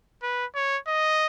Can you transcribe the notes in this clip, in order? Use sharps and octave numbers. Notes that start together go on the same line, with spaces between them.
B4
C#5
D#5